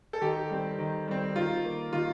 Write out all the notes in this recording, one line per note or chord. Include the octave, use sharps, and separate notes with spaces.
A4
D#3 G4
G3 C4
D#3
G3 C4
D#3 F4
A#3
D#3 F4